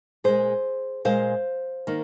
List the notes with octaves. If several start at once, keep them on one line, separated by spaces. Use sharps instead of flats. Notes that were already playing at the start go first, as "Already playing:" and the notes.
A#2 G#3 G#4 C5
A#2 G#3 C5 F5
D#3 A#3